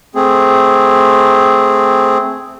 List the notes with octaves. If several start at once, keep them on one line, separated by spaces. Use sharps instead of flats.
A3 C4 G#4